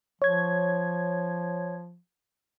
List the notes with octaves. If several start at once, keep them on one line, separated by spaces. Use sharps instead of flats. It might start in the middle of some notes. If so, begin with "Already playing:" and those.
F3 C#5 G#6